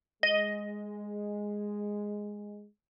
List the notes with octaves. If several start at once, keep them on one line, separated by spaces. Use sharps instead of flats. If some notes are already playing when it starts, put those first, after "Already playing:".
G#3 D#5